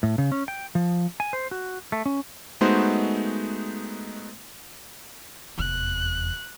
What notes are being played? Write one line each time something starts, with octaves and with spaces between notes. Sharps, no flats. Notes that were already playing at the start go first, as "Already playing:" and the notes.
A2
C#3
C#4
G5
F3
G#5
C5
F#4
A3
C#4
G#3 A3 B3 D#4 F#4 C5
F1 E2 F#6